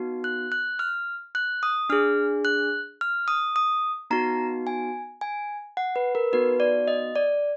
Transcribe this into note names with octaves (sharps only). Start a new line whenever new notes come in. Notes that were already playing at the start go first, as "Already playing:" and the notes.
Already playing: B3 D#4 F#4
F#6
F#6
F6
F#6
D#6
D4 G#4 F6
F#6
F6
D#6
D#6
B3 D#4 F#4 A#5
G#5
G#5
F#5
B4
A#4
B3 D#4 F#4 B4
D5
D#5
D5